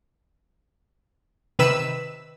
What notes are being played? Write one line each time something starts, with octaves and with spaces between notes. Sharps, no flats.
C3 D#3 B4 E6 B6 E7